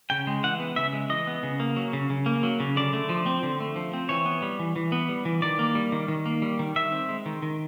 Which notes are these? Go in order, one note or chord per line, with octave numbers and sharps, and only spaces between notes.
C#3 G5
G#3
E3 F#5
B3
C#3 E5
G#3
E3 D#5
B3
C#3
A#3
F#3
C#3
C#3
A#3
F#3
C#3
D3 D5
A3
F3
C4
D3
A3
F3
C4
E3 C#5
B3
G3
E3
E3
B3
G3
E3
D#3 D5
A#3
G3
D#3
D#3
A#3
G3
D#3
D#3 E5
C4
G#3
D#3
D#3